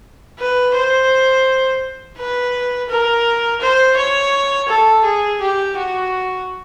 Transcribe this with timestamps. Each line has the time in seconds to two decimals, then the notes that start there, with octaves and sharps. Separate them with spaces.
0.39 B4
0.75 C5
2.18 B4
2.89 A#4
3.61 C5
3.97 C#5
4.69 A4
5.05 G#4
5.41 G4
5.77 F#4